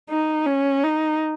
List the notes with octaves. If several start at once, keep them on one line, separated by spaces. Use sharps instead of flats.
D#4
C#4
D#4